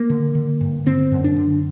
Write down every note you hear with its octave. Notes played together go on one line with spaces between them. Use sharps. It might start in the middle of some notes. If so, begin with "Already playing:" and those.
Already playing: A#3
D3
D3
G2
D3 C4
F#2
D4
D3